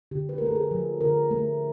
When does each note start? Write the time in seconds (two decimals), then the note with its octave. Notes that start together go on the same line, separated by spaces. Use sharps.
0.11 D3 G4
0.29 B4
0.38 A3 A#4
0.47 A4
0.56 G#4
0.71 F3
1.01 D3 A#4
1.31 A3